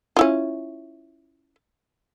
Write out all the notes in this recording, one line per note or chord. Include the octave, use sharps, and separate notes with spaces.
C#4 E4 F4